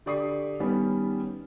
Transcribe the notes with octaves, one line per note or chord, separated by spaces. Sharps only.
D3 G4 D5 C#6 D#6 C7
D#3 G3 B3 C#4